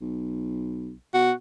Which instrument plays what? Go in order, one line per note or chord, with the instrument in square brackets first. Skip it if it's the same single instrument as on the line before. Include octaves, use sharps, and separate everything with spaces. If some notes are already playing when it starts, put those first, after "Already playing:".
[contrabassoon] B1
[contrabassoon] B2 [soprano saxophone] F#4